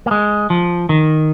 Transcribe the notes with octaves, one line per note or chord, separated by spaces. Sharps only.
A#3
G#3
F3
D#3